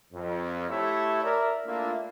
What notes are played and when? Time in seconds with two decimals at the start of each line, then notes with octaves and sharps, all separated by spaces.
0.13 F2
0.69 A3 E4 G4 C#5 E5
1.23 A#4 D5 E5
1.66 A3 A#3 D4 E4 F4 E5